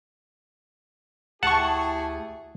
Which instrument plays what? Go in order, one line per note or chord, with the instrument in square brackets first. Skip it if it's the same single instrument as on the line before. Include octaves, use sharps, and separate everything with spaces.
[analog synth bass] D2 [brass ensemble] E4 G4 G#4 [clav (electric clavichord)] F#5 [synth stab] A5 C#6